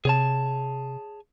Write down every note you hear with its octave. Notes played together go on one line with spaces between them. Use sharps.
C3 G#4 C#5 A5